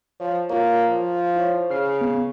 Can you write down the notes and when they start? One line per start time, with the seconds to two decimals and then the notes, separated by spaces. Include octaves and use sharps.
0.20 F3 C#5
0.49 A#3 F4 C#5
0.89 F3
1.36 E4 C5 C#5
1.70 C#3 F6 C7
2.01 B3